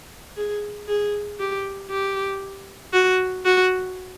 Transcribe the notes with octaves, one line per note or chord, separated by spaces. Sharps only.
G#4
G#4
G4
G4
F#4
F#4